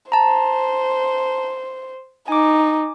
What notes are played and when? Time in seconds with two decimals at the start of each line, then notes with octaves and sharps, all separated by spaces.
0.12 C5 A5 A#5
2.28 D#4 G#5 D6